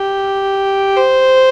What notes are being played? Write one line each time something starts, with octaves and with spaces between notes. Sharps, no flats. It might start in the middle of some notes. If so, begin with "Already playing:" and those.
Already playing: G4
C5